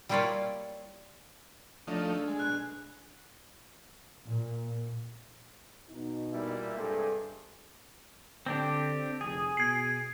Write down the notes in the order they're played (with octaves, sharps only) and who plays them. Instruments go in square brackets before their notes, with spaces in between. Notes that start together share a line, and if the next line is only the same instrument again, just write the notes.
[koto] G3 A#3 E4 F4 C#5 D5
[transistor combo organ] F3 A3 D#4 [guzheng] D4 D5 A#5
[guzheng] G#4 A4
[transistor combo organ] G#3
[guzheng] B2 [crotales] F#6
[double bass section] A#2
[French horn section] B2 D#4
[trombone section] A#2 G3 E4
[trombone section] G2 C3 G#3 [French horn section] A4
[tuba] D3 [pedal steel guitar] C4 D4 G4
[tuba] F1 [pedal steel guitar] G#4
[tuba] B2 [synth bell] G#6 C7